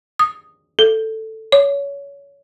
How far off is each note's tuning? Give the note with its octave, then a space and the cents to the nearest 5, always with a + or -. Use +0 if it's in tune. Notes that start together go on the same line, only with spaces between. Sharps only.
D#6 -5
A4 +5
C#5 +25